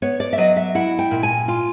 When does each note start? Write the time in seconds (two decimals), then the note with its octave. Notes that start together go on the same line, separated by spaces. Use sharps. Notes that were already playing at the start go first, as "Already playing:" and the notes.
0.02 B3 C#5
0.20 D5
0.33 E5
0.38 F#3 D#5
0.57 E5
0.75 E4 F#5
0.99 G5
1.11 A#2
1.23 G#5
1.48 F4